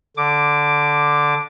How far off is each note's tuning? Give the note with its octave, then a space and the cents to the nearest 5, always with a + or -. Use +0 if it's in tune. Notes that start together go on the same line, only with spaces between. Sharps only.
D3 +0 D6 +5